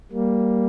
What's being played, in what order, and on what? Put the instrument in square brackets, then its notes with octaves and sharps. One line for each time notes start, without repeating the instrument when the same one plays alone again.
[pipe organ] G3 A#3